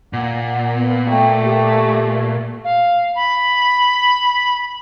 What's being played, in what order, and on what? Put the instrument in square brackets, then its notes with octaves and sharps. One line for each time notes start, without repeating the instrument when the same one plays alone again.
[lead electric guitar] A#2 [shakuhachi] F#5
[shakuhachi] B3
[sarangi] A3 [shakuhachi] G5
[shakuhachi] G4
[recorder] F5
B5